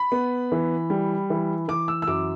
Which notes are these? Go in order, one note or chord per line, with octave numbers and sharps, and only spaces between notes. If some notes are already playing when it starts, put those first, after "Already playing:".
Already playing: B5
B3
E3
G3
E3
E3 D6
E6
E6
F#2 D6